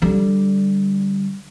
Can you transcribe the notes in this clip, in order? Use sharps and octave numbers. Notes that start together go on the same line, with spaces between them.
D3 G3